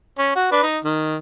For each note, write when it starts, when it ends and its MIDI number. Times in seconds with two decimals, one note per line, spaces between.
0.18 0.31 61
0.36 0.48 66
0.52 0.63 62
0.52 0.63 71
0.63 0.78 63
0.84 1.16 51